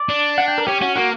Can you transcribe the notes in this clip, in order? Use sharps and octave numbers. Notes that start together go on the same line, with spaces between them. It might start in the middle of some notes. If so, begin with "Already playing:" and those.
Already playing: D5
D4
F#5
G5
A#4
C#4 G4
C#4 F#4
A#3 F#4